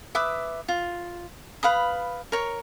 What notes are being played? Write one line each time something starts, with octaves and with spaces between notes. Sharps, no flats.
B4 E5 D6 D#6
F4
B4 F5 B5 D#6
A#4 C#5